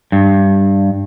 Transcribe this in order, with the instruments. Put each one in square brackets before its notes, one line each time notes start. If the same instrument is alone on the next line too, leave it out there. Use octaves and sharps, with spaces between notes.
[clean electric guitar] G2